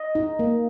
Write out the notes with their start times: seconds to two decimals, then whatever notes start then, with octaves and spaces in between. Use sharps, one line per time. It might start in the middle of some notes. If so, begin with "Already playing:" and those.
Already playing: D#5
0.15 D#4
0.39 A#3